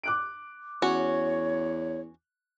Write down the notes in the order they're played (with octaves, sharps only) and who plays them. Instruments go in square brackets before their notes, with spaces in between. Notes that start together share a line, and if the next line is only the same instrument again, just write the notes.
[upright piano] D6 F#6 D7
[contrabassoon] E2 [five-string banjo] C#4 F#4 [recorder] C#5